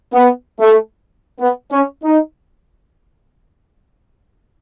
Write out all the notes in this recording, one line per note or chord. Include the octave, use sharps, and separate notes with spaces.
B3
A3
B3
C#4
D#4